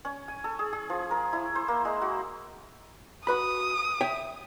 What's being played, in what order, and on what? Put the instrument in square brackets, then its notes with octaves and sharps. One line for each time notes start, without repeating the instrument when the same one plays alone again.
[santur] C#4
G#5
A4
G#4
G#4
F3
A#4
E4
C5
A#3
G#3
F#4
[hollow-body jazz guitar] F#4 B4 B5 [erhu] D#6
[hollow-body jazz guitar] C#5 E5 G5